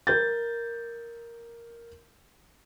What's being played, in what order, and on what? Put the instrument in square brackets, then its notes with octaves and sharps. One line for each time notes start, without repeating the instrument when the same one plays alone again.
[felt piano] A#4 G6 A6